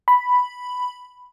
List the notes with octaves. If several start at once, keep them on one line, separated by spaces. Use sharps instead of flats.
B5